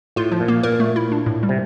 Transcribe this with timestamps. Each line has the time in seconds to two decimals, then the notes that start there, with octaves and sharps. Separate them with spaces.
0.16 A2 F4
0.32 F3
0.40 A#2
0.48 A#3
0.63 A#2 A#4
0.80 A3
0.96 E4
1.12 D4
1.26 A2
1.43 G3
1.49 C3